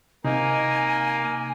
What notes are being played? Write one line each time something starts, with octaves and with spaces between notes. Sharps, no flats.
C3 A#3 D#4 G#5